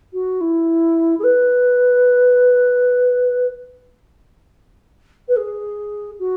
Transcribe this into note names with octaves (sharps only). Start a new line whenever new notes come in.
F#4
E4
G#4
B4
B4
G#4
F#4